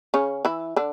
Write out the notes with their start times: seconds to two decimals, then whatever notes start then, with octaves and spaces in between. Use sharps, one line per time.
0.14 C#3 C#4
0.45 E3 E4
0.76 D3 D4